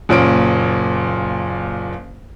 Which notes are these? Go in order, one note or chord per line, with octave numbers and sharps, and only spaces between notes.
F#1 A#2 C#4 D7